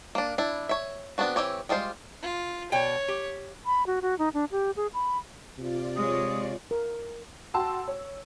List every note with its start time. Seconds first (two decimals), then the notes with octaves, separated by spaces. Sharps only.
0.15 A#3 D4
0.38 D4 E4
0.69 C#5 E5
1.18 B3 C4 D4 F#4
1.36 E3 A3 C4 G4 C#5
1.69 G3 G#3 F4 C5
2.22 F4
2.72 B2 C#5 D5 G5
3.08 G4
3.66 B5
3.87 F#4
4.02 F#4
4.19 D#4
4.34 D4
4.52 G4
4.77 G#4
4.94 B5
5.58 C3 F4 D5
5.96 G#3 C#5 D#6
6.71 A#4
7.54 F#4 G5 A5 C6 E6
7.88 C#5